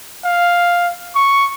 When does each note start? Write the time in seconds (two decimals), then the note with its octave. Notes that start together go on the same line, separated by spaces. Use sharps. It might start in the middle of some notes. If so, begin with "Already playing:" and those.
0.24 F5
1.15 C#6